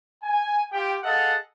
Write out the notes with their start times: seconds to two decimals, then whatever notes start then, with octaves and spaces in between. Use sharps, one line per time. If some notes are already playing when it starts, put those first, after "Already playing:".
0.23 G#5
0.72 F4 G4 G5
1.03 G#4 A4 D#5 F5 F#5